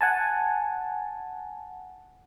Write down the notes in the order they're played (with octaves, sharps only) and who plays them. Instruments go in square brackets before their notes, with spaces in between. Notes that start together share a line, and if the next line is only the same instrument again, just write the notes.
[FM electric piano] F#5 G#5 A5